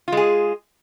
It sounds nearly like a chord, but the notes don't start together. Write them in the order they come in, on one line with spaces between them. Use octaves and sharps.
F4 G#3 G#4